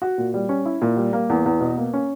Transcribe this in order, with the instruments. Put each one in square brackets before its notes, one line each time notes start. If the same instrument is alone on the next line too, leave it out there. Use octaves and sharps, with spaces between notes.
[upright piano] F#4
A#2
G3
C#4
E4
A#2
G3
A#3
E2
E2
B2
A#3
C#4